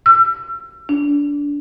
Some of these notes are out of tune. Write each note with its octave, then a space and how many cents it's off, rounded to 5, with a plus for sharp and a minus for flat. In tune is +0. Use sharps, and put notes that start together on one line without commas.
E6 +35
D4 -20